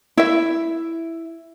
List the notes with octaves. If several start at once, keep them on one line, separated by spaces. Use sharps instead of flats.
E4 E5